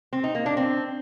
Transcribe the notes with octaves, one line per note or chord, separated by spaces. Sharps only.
C4
D#4
A#3
D4
C4